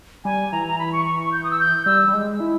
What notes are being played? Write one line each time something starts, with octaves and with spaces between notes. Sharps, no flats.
G3 G#5
E3 A#5
A#5
B5
C#6
C#6
C#6
G6
D#6
E6
G6
G3 E6
G3
G#3
E4